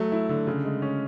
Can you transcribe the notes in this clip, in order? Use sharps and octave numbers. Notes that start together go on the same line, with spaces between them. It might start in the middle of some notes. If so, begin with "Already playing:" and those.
Already playing: F#3 A3
E4
D3
C#3
G#3
C#4